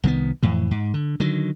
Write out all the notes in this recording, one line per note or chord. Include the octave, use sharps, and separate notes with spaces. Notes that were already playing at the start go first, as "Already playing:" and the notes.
C2 D#3 G#3 B3
F2 A2 E3
G#2
D3
D3 D#3 F#3